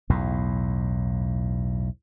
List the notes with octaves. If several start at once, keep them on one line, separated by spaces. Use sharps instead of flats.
B1 E2 A2